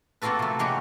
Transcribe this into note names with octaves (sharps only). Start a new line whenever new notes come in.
A#3 C4 F4 F#4 A4 B4
C3 A3
G#3 A#3 C#4 F#4 G4